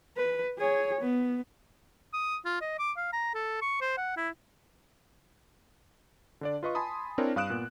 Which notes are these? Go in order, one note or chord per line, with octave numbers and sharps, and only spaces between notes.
B4
G#4 C#5
B3
D#6
F4
D#5
D6
F5
A#5
A4
C#6
C5
F#5
E4
D3 D4 D5
F4 B4 D#5 C#6
G#5 A5 B5 C6 D#6
C4 D4 E4 A#4 C#5
G2 F5 D#6 F#6 D7 E7
A#2 B3